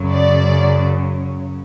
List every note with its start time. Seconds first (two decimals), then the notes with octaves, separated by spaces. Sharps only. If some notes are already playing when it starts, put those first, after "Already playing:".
Already playing: F#2 C#3 F#3
0.10 D5